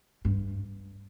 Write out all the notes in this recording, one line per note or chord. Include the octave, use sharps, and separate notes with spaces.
G2